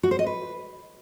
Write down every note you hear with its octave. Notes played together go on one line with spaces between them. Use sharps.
F#4
C5
D#5
B4